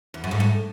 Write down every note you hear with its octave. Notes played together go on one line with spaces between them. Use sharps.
E2
F#2
G#2
A2